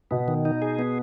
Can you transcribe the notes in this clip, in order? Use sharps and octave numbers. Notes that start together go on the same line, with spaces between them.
B2 B3
D#3
D#4
G#4
B3